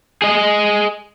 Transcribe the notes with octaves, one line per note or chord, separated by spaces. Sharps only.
G#4 D#5